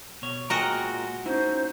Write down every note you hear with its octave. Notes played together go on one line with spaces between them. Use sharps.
B2 C#5
A#2 G#3 F#4 A#4 D#5 G5 G#5 A#5
C#4 D#4 E4 C5